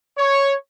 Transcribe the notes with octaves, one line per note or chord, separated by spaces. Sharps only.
C#5